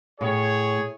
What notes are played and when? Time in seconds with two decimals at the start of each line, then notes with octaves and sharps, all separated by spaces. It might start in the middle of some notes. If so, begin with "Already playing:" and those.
0.21 A2 G#4 C#5